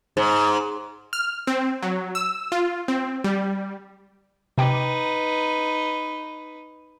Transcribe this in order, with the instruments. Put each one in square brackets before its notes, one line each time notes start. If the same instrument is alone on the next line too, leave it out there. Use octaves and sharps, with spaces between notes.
[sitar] G#2
[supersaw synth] F6
C4
F#3
E6
F4
C4
G3
[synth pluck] C3 G5 D6 [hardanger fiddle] D#4 B4